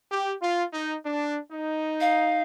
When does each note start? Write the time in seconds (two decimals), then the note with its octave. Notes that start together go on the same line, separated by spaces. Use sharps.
0.11 G4
0.42 F4
0.73 D#4
1.06 D4
1.53 D#4
2.01 F5